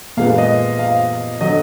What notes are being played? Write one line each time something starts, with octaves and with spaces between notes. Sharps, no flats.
A#2 G#3 B3 F5
D#5
F5
D3 F#3 D#5